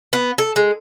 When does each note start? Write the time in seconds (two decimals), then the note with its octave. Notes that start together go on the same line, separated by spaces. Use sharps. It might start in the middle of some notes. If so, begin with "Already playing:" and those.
0.13 B3
0.38 A4
0.56 G#3